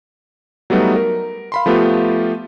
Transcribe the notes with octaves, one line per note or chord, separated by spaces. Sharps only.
F#3 G3 A3 B3 D#4
A#4
F5 B5 C6
F3 A3 B3 F4 G4